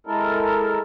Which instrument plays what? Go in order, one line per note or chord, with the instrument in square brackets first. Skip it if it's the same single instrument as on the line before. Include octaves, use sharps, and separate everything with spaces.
[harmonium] G#3 E4 A4 A#4